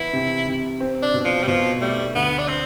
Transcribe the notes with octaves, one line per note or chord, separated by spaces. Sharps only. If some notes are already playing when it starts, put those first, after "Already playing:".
Already playing: E3 B3 E4
C3
C3
C4
D4
B2
F3
G3
B2 F3
G3 A3
D2 B3
D4
C4